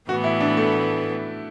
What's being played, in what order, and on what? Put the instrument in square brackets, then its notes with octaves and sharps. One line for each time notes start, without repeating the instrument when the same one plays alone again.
[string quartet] A2 E3 B3 [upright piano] F#4
[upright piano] E4
D4
A3